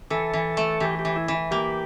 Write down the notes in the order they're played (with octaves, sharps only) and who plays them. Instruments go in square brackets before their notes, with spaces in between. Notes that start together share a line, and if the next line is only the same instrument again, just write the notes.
[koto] E3 [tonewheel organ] A4
[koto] E3
A3
[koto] E3 [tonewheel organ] G4
[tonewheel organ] G4
[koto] E3
[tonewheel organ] E4
[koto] E3
[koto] A#3 [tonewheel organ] G4